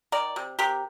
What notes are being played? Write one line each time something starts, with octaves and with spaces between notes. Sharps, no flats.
D#3 A#4 D5
C3
C3 G4 A#4